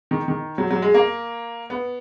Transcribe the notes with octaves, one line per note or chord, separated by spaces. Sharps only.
D#3
D#3
F#3
F#3
G#3
A#3
B3